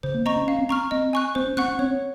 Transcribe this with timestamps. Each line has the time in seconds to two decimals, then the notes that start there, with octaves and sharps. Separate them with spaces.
0.03 C#3 C5
0.14 A#3
0.26 C4 D#5 A#5 C#6
0.36 C#4
0.47 C#4 F5
0.59 C4
0.69 C4 A#5 C#6 F6
0.91 C4 D#5
1.13 G#5 C#6 F#6
1.35 C4 C5
1.47 C#4
1.57 C4 F#5 C#6 F#6
1.68 C#4
1.79 C4 C#5